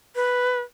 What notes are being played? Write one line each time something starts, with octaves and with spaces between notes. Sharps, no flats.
B4